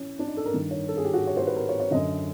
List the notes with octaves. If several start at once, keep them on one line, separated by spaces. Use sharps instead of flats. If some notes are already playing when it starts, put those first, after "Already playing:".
Already playing: E3 C#4
D4
D#4
A4
A#4
G2 D#3
C#5
A4
G#4
G4
F#4
C#5
C5
B4
A#4
C#5
C#5
F#2 D3 D#5